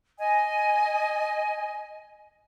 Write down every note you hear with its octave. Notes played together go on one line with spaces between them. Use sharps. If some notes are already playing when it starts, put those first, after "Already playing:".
D#5 G#5